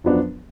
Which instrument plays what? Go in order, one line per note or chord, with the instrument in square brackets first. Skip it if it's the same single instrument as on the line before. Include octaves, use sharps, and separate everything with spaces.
[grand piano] F#2 F3 B3 D4